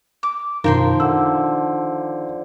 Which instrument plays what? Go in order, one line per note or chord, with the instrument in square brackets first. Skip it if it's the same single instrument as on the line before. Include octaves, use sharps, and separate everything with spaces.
[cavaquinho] D6
[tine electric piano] F#2 B2 [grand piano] D#3 [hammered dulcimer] F3 [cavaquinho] A#4 G5 C6
[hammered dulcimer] D3 [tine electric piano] E6